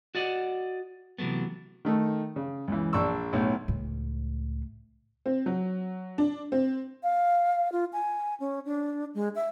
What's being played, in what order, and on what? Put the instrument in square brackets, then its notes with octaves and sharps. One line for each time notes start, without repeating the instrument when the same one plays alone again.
[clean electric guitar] F#4 D5 D#5 F#5
C3 E3 F#3 A3 B3
[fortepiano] D#3 A3
C#3
C#2 E3
A#1 D5 A5 C#6 E6
B1 A2
[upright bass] C#2 A2
[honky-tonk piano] C4
F#3
D4
C4
[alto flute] F5
F4
G#5
C#4
D4
G#3
E5